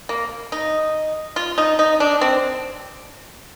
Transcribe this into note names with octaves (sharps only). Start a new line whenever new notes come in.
A#3
D#4
F4
D#4
D#4
D4
C4